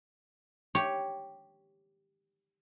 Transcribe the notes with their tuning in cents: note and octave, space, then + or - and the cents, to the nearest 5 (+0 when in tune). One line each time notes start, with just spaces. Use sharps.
G4 +0 C#5 +0